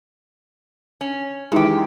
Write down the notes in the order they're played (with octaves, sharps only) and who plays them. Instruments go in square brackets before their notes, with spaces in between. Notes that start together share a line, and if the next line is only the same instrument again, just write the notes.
[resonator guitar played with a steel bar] C#4
[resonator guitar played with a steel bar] F#2 G4 [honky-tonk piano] D#3 E3 G#3